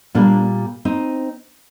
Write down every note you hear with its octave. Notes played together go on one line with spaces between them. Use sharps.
A#2 G3 A#3 D4
C4 D#4